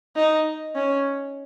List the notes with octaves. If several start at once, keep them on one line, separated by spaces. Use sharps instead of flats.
D#4
C#4